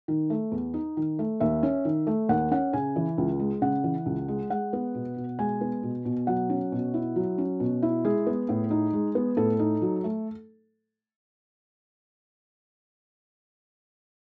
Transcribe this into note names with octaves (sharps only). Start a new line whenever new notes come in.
D#3
A3
E2
D#4
D#3
A3
D#2 E5
C#4
D#3
A3
D#2 F#5
C#4 F#5
C#3 G#5
E3
C#2
G#3
C#3 F#5
E3
C#2
G#3
G#3 F#5
B3
B2
B2
G#3 G#5
B3
B2
B2
F#3 F#5
C#4
B2
E4
F#3
C#4
B2
E4
G#3 G#4
B3
A2
D#4
G#3
B3
A2 A4
D#4
F#3
A3